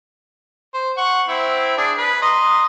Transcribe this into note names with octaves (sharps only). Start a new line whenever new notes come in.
C5
F#5 C#6
C4 E4
D4 G#4
B4
D#5 A#5 C6